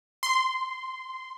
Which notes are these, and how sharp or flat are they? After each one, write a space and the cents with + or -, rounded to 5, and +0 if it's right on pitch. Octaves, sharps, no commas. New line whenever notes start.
C6 -10